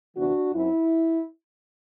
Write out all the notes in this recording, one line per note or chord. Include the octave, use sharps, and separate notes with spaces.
D2 C3 E3 B3 D4 F#4
F#2 F#3 C4 E4